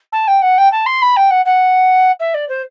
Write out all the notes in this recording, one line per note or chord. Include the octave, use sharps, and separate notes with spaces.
A5
G5
F#5
G5
A5
C6
B5
G5
F#5
F#5
E5
D5
C5